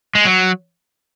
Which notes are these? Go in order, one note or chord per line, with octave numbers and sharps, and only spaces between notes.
G#3
F#3